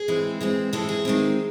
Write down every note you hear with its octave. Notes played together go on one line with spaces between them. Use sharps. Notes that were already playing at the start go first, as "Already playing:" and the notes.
Already playing: G#4
E3 G#3 C4
E3 G#3 C4
E3 G#3 C4 A4
G#4
D#3 G#3 C4